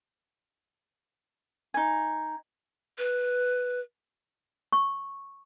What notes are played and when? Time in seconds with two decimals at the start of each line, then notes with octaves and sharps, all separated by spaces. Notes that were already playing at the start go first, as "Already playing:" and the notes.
1.74 D#4 G#5
2.98 B4
4.73 C#6